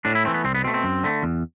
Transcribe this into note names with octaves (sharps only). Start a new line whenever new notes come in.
A2 D4
E4
E3 A3 C4
B3
C2 C4
B3
B2 A3 C4
C4
F#2
D3 A3
E2